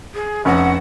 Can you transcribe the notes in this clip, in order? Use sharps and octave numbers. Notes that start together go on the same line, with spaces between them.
G#4
F1 C#4 F#5